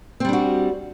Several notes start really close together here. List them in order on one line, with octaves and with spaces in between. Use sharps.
C4 G3 D4 F#4